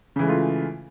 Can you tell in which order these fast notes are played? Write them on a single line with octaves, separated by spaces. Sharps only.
C#3 E3 G#3 A3 F4